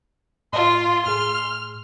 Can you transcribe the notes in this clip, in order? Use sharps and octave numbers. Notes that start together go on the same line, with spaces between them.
A2 F4 C6
A2 G#4 F6